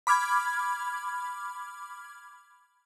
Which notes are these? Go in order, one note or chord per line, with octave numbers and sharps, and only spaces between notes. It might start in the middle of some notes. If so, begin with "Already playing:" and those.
B5 D6 F6 G#6